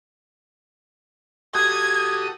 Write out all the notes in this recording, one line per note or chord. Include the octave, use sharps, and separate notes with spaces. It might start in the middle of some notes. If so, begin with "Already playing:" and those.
F#4 G4 A4 D#6 G#6